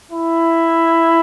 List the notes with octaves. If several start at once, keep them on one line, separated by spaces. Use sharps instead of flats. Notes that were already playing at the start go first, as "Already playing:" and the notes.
E4